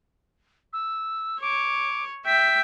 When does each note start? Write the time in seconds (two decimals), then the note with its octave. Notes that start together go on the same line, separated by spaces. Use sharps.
0.73 E6
1.41 C#5 D6
2.27 E5 G5 B6